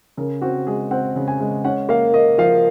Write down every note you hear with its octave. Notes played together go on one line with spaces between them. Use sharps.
C#3 A#4
C4 F#4
G#3 G#4
C4 F#5
C#3
G#5
G#3
C#4 F#5
A#3 F5
A#3 D#5
F3 F5